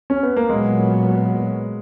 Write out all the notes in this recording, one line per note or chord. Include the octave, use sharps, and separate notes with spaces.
C#4
B3
A#3
A#2 F#3 G#3 B3